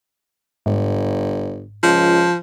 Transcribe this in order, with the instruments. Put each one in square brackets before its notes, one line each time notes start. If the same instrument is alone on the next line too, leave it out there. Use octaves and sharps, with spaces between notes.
[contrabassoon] G1 [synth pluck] G#2
[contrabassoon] C#2 [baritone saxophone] F3